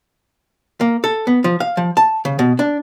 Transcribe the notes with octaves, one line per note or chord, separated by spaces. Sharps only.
A#3
A4
B3
F3
F5
F3
A5
C#3
B2
D4